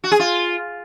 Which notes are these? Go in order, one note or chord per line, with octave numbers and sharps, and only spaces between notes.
F#4
G#4
F4